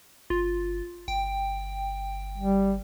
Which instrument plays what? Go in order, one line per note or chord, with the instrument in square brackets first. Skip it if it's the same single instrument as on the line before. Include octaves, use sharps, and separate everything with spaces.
[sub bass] G1 [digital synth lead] F4
[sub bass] G1 [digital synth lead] G5
[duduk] G3